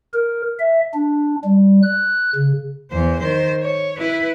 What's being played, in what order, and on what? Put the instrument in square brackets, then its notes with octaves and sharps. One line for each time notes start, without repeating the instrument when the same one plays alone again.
[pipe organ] A#4
E5
D4
G3
F#6
C#3
[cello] E2 C5
D#3 C5
C#5
E4 B4